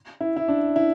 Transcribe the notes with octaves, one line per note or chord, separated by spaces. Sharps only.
E4
E4
D4
E4